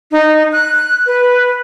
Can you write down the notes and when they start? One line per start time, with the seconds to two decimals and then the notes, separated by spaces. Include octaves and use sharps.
0.12 D#4
0.53 F#6
1.06 B4